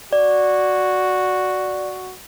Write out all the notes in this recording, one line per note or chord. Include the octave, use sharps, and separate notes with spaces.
F#4 D5